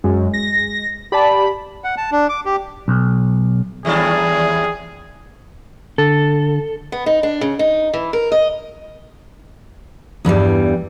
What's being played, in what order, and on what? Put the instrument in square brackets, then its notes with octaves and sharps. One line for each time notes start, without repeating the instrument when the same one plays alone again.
[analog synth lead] F#2 [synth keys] G#3
[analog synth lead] A#6
[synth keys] G4 D5 A5 [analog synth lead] B5
[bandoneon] F#5
A5
D4
D6
G4
[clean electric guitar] B1
[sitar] D#2 G3 D4 [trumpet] G#4
[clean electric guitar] D3 [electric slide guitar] A4
[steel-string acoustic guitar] B3
D#4
D4
C#3
D#4
E3
A#4
D#5
E2 G2 E3 G3